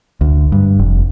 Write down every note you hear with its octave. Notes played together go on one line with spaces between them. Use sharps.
D2
G2
F1